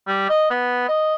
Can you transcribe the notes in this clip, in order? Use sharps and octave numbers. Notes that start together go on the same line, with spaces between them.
G3
D#5
B3
D#5